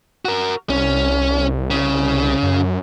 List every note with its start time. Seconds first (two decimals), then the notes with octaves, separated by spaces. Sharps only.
0.25 F#4 A#4
0.70 C2 C#4
1.71 C#3
2.43 F#2